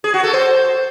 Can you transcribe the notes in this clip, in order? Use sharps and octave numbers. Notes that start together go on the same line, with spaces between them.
G#4
F#4
A4
C5